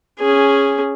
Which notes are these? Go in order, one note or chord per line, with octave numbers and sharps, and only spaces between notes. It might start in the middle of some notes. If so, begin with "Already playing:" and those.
C#4 G#4